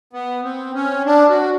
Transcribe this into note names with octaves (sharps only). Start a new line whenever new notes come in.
B3
C4
C#4
D4
F#4